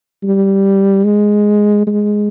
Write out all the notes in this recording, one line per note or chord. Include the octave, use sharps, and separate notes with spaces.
G3
G#3
G#3